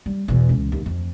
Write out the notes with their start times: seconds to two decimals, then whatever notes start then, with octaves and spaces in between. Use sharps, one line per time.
0.06 G3
0.28 E2 B2
0.49 C#2 E3
0.72 D#2
0.86 F2